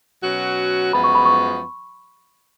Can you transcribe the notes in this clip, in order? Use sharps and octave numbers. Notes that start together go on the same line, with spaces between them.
B2 F#3 C#4 F#4
F#2 F3 G#3 B3 B5
C#6
B5
C#6